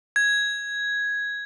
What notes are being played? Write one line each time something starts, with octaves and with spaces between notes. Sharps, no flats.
G#6